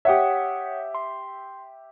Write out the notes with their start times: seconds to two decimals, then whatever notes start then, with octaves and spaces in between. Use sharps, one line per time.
0.05 G4 C#5 E5 F#5 D#6
0.95 C6